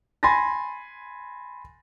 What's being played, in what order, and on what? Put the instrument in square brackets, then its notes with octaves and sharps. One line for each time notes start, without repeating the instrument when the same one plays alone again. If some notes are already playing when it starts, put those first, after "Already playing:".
[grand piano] G#5 B5 C6 A6 A#6